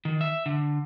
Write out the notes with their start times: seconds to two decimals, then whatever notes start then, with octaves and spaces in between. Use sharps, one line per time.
0.05 D#3
0.21 E5
0.46 D3